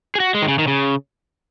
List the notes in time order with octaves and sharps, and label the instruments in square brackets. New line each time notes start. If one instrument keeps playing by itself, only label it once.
[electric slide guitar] G#4
F#4
G#3
D#3
C#3
D#3
C#3